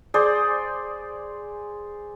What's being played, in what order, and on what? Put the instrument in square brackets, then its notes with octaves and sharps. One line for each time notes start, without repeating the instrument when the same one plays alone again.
[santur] G#4 C5 D5